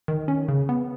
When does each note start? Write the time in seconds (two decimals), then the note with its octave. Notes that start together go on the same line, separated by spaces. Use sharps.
0.08 D#3
0.28 C#4
0.48 C#3
0.69 B3